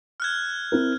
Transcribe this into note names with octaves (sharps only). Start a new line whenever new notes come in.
F6 F#6 G#6
C4 E4 A#4